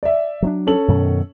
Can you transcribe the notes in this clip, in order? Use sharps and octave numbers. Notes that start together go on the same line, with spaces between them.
D5 E5
F#3 C4 D4
C#4 A4 F#7
F#2 B2 D#3